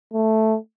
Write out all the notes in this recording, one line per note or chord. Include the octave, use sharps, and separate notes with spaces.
A3